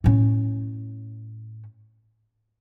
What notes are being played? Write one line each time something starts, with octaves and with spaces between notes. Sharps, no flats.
A2 C#4